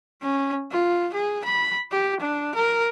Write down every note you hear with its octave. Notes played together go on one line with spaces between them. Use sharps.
C#4
F4
G#4
B5
G4
D4
A#4